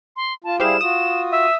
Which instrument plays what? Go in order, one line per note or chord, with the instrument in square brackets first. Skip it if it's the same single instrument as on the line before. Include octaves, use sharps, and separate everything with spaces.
[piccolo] C6
[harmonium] F4 [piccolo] A5
[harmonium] G3 E4 G#4 [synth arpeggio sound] G4 C5 F5 [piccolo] E7
[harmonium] F4 F#4 [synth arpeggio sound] D#6
[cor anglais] E5